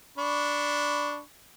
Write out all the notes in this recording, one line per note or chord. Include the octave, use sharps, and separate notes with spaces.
D4 B5 C#6